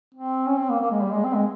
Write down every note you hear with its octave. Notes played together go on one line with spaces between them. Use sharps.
C4
C#4
C4
A#3
A#3
G#3
G3
G#3
C4
G#3